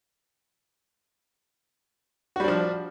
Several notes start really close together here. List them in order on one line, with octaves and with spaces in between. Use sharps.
F#4 G3 D4 F3